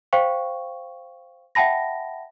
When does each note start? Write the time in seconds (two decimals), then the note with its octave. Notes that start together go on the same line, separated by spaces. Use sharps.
0.13 C5 F5 G5 C#6
1.55 E5 F#5 G5 A5 B5 A#6